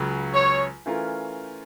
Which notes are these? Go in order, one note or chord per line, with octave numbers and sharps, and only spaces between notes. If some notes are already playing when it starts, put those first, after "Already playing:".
Already playing: C#2 C#3 F#3
C#5
E3 A3 C#4 F4 A#4